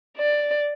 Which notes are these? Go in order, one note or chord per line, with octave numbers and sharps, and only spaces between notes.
D5